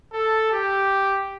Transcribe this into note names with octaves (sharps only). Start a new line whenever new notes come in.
A4
G4